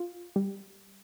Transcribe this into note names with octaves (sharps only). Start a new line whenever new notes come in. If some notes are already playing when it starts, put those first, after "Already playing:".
Already playing: F4
G3